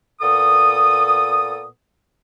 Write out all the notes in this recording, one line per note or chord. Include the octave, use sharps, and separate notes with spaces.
A#2 B3 A4 D#6